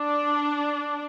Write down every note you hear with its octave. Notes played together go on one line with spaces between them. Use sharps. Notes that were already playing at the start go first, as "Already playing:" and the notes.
Already playing: D4